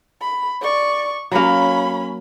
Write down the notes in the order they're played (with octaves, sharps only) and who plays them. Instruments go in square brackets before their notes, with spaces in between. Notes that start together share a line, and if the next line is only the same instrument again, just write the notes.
[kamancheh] B5
D5 C#6
[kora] F#3 A#3 [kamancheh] C#4 B5